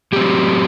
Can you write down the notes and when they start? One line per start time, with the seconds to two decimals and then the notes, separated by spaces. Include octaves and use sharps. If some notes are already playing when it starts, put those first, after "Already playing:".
0.12 A2 F#3 C4 G4